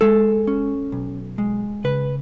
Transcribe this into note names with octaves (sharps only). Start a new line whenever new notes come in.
G#3 A4
C#4
B1
G#3
C#3 B4